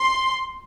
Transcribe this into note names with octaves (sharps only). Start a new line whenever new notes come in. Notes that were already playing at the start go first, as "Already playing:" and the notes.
Already playing: C6